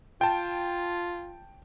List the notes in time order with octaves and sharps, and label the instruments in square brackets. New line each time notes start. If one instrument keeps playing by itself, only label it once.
[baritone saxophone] F4 [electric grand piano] G5 A5